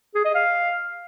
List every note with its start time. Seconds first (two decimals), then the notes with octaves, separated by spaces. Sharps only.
0.15 G#4
0.25 D#5
0.35 F5